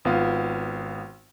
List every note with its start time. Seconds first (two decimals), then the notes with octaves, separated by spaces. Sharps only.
0.05 G#1 B3 F4